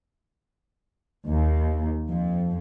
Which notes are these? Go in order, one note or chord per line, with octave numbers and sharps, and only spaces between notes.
D#2
F2